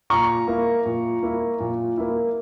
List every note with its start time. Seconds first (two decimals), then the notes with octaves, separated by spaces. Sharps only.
0.10 A#2 A#5 C#6
0.47 A#3 E4
0.85 A#2
1.23 A#3 E4
1.60 A#2
1.98 A#3 E4